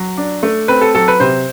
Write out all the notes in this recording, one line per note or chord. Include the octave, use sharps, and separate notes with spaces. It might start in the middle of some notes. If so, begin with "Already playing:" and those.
Already playing: F#3
D4
A3
C4 B4
A4
F#3 A4
B4
C3 C5